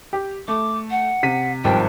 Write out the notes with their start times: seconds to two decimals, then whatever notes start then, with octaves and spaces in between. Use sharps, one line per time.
0.13 G4
0.48 A3 D6
0.91 F#5
1.23 C3 B6 D#7
1.64 G#1 G2 F3 G5